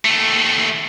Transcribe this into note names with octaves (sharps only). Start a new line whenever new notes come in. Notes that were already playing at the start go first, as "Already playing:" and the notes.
D#2 A3